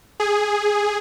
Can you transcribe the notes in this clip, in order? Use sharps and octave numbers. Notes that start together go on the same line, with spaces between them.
G#4